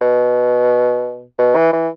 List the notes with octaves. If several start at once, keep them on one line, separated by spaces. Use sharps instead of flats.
B2
B2
E3
E3